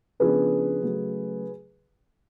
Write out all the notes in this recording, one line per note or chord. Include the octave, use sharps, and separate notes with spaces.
C#3 F3 B3 D4 G#4 B4
C#3 F#3 A3